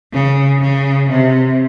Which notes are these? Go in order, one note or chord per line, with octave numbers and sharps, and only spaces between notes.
C#3
C#3
C3